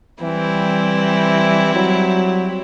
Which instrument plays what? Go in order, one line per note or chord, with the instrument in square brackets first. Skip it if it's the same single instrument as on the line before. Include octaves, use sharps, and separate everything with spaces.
[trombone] E3 [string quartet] G3 C4 E4 G4
[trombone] F#3